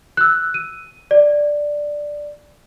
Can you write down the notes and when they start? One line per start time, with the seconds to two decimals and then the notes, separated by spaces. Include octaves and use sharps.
0.17 E6 F#6
0.54 D#7
1.11 D5